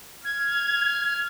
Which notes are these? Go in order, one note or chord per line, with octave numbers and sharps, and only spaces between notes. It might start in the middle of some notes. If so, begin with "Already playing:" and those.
F6 G#6